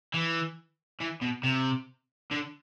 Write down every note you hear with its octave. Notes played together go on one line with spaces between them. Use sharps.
E3
E3
B2
C3
D3